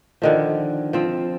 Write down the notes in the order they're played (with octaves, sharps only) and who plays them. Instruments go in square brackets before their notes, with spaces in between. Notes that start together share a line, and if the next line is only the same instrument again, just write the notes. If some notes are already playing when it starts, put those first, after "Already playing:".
[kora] D3 D#3 F3
F3 C4